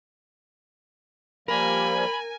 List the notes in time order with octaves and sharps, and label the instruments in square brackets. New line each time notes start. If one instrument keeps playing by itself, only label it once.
[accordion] F3 G3 A#3 [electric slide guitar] A#4 [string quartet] G#5 [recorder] B5